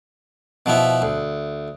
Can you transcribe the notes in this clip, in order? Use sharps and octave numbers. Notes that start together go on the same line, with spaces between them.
B2 F3 B3 E4
D2